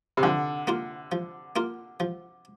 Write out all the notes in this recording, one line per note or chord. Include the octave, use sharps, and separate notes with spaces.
C3
D3 F3
A#3 F4 A#4
F3
A#3 F4 A#4
F3